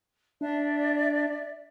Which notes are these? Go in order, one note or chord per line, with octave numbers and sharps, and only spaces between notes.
D4 D5 E5